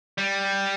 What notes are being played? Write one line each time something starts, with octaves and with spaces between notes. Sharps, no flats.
G3